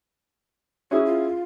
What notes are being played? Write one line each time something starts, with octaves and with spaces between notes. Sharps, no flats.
C#4 E4 F#4 G#4
F4